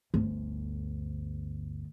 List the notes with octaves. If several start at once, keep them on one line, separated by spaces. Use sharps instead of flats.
G1 D2